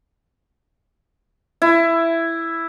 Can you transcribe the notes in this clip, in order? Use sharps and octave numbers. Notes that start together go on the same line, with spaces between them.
E4